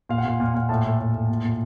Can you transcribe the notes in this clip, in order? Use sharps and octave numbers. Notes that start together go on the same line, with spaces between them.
A#2 F5
F#5
A#2 F5
A#2 F5
A#2 F#5
A2 A5
A2
A2
A2
A#2
A#2